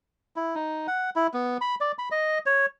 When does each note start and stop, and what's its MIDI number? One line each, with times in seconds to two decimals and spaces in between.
0.36 0.55 64
0.55 0.87 63
0.87 1.10 78
1.16 1.27 64
1.34 1.57 59
1.61 1.75 83
1.81 1.92 74
1.99 2.09 83
2.11 2.39 75
2.46 2.66 73